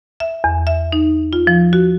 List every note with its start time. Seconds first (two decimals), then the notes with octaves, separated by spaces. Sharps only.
0.20 E5
0.44 E2
0.67 E5
0.92 D#4
1.33 F4
1.47 F3
1.73 F#4